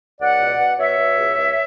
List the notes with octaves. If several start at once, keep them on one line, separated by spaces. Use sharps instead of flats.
C#2 D5 F#5
B2
B2
B2 C#5 E5
B2
C#2
C#2